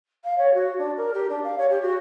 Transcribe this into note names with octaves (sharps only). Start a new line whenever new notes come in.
F5
C#5
F#4
D4
A#4
G4
D4
F5
C#5
G4
F#4